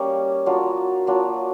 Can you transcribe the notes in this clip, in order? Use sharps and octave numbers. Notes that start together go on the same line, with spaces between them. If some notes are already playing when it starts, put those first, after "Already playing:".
Already playing: G3 A#3 C#4
F#3 A#3 D4 F4
F#3 A#3 D4 F4